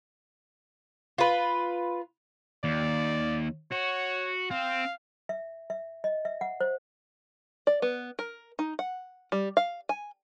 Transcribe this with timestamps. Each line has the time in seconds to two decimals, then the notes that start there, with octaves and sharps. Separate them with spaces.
1.18 F4 B4
2.64 D#2 D5
3.72 F#4 C#5
4.51 C4 F5
5.29 E5
5.70 E5
6.04 D#5
6.25 E5
6.41 F#5
6.61 C5
7.67 D5
7.82 B3
8.19 A#4
8.59 D#4
8.79 F#5
9.32 G3
9.57 F5
9.89 G#5